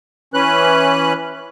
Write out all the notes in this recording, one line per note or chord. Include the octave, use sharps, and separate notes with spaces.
E3 C#4 B4 F#6